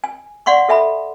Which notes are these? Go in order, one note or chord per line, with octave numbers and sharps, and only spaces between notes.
G#5
D5 F5 F#5 C6 C#6
A4 E5 G#5 B5